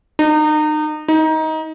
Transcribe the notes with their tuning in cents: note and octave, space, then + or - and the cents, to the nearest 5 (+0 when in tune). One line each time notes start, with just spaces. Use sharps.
D#4 -30
D#4 +20